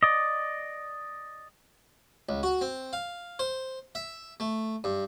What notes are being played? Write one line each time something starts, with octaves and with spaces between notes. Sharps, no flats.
D5 D#5
C#2
F#4
C4
F5
C5
E5
A3
G2